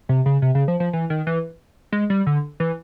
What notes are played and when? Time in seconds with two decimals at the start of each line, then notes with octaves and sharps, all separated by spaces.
0.09 C3
0.26 C#3
0.42 C3
0.55 C#3
0.68 F3
0.80 F3
0.93 E3
1.10 D#3
1.27 E3
1.92 G#3
2.10 G3
2.26 D3
2.60 E3